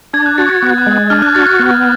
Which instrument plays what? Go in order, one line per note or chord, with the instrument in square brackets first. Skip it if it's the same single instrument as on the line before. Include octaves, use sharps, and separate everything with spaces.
[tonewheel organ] D4 [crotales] G#6
[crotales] F#6
[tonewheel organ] F#4 [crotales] A6
[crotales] G#6
[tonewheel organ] B3 [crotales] F#6
[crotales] F#6
[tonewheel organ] G#3
[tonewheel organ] D4 [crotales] F6
[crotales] F#6
[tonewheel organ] F#4 [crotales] A6
[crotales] F#6
[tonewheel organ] B3